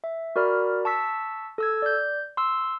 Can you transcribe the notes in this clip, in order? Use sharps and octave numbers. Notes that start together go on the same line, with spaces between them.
E5
F#4 A#4 D5 B5 F6
A5 C#6 E6 B6
A4 E6 G#6
D5 G6
C6 E6